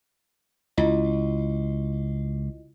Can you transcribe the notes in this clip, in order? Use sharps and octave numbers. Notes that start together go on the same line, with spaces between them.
C#2 E4 F4 D#5